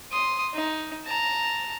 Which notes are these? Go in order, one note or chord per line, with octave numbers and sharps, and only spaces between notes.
C6 D#6
D#4
A5 A#5